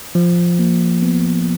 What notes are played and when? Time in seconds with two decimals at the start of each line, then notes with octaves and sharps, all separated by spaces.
0.15 F3
0.59 A#3
1.02 B3